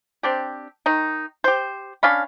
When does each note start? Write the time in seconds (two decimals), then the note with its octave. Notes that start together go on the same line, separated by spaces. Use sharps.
0.23 C4 D4 G4
0.86 D#3 D#4
1.44 G4 C5
2.03 C#4 D4 F5 B5